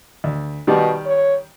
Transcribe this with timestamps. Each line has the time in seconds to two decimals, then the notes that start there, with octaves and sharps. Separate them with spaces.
0.24 D2
0.67 B2 D#3 G3 D5
1.06 C#5